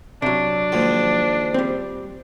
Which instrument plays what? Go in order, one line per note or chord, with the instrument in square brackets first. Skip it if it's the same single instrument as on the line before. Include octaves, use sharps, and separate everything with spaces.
[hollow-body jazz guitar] C3 F#3 [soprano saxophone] D4
[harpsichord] D#2 G#2 F3
[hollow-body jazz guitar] G3 C4